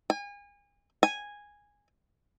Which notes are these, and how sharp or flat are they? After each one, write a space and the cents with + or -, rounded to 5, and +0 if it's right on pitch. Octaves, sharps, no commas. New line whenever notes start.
G#5 -35
G#5 -10